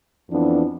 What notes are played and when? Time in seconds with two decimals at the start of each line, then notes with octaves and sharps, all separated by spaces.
0.29 F2 E3 B3 D4